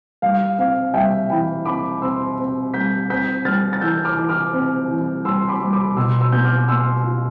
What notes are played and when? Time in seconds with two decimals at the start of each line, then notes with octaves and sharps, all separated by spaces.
0.22 G3 F5
0.58 C4 F5
0.94 G3 E5 G5
1.30 E3 G5 B5
1.66 C4 B5 D6
2.02 C4 C6 E6
2.38 C4
2.74 G3 G6 B6
3.10 C4 G6 B6
3.45 G3 F6 A6
3.73 A6
3.81 E3 E6 G6
4.05 D6 F6
4.17 E3
4.29 D6 F6
4.53 C4
4.89 E3
5.25 G3 C6 E6
5.49 B5 D6
5.61 G3
5.73 B5 D6
5.96 B2 C6 E6
6.21 C6 E6
6.32 B3 G6
6.44 D6 F6
6.68 B3 C6 E6
7.04 F4